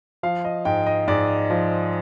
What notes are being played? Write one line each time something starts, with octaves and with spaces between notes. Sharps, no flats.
F3 F5
D#5
G#2 G5
D#5
G#2 D5
F3